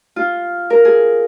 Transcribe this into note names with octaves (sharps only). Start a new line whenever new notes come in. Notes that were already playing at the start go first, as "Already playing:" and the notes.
F4
A#4
G#4